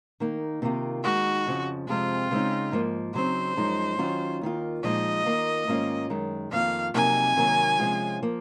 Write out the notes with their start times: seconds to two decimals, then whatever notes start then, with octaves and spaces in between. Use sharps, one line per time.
0.20 D#3 A#3 D#4
0.62 C3 D#3 A#3 F4
1.03 D#3 G#3 D#4 F#4
1.46 F2 C#3 F3
1.88 F2 C3 F3 G#3 C4 F4
2.31 C#3 G#3 C4 D#4
2.72 G#2 F3 A#3
3.15 C#3 F#3 C4 D#4 C5
3.56 F#2 F3 G#3 D#4
3.98 D#3 F#3 C#4 F4
4.42 D#2 D#3 A#3 F4
4.84 A#2 F3 G#3 D#4 D#5
5.25 D#3 A#3 F4
5.67 G#2 D#3 A#3 C#4 F4
6.10 F#2 D#3 G#3
6.52 F2 D#3 A#3 F4 F5
6.94 F2 C3 F#3 A#3 D#4 G#5
7.36 C3 D#3 F#3 A#3
7.79 C3 F3 G#3 C#4 F4
8.22 F3 A#3